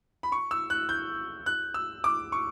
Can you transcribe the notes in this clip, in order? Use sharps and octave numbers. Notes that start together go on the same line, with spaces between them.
B5
C#6
E6
F#6
G6
F#6
E6
D6
C#6